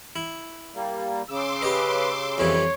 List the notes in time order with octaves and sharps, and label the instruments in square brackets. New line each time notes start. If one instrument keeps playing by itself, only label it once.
[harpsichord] E4
[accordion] G3 A#3
[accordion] C#3 E6 [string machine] C6 D6
[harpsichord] G4 D#5 [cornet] B4
[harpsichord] F2 E3 G3 [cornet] C#5